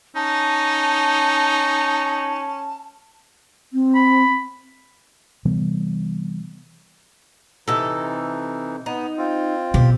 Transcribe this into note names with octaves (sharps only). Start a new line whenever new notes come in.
C#4 D#4 A5
C4
B5
C3 E3 G3 B3
C3 E3 D#4 A4
B3 D#4
C4 F4
B2 G4